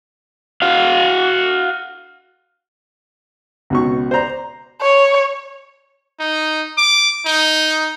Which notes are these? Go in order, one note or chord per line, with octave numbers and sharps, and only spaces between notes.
F#4 F5
C#2 B2 C#6
C5 D5 A#5
C#5
D#4
D6
D#4